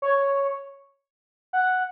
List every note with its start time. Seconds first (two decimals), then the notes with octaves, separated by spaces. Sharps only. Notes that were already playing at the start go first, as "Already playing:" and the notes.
0.02 C#5
1.53 F#5